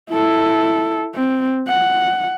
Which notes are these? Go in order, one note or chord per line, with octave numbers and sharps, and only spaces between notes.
E4 A4
C4
F#5